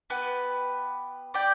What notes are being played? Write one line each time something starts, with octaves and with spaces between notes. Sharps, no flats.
B3 G4 B4
G4 D5 G5